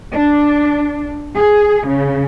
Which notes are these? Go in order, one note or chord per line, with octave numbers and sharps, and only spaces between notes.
D4
G#4
C#3